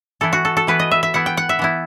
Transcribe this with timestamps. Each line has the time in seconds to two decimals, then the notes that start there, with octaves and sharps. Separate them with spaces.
0.21 E3 B3 E4 A4
0.33 F#4
0.45 A4
0.57 A4
0.67 E3 B3 E4 B4
0.79 D#5
0.91 E5
1.03 E5
1.14 E3 B3 E4 F#5
1.26 G5
1.37 F#5
1.49 E5
1.59 E3 B3 E4